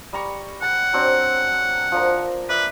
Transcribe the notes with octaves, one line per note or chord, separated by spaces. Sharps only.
G3 A#5 C#6
F#5 A5
F#3 C4 D4
F3 D4 A#4
B4 D5 E5